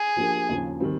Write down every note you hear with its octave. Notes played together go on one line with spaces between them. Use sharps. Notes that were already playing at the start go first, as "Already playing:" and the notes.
Already playing: G#4
F3 A#3 D4 G4 A#4
D#2 C#3 F3
D#3 G3 C4